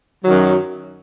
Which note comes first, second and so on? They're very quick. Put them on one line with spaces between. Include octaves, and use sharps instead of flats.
F#3 D#3 F#2